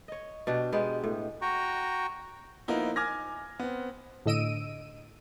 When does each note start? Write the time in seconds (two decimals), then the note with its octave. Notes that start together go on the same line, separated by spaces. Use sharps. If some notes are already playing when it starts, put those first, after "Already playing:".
0.08 C#5 D#5
0.47 B2 D4 G4
0.73 G#3 B3 G4
1.04 A2
1.42 F#4 G5 A#5 C#6
2.68 F3 A#3 B3 D#4 E4
2.96 G#5 D6 F6 G#6 A#6
3.59 B3 C4
4.26 A2 D3 D#5 E6 D7 D#7